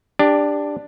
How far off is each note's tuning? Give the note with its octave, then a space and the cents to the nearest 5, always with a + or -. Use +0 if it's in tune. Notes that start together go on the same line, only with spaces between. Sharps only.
D4 +0 G4 +20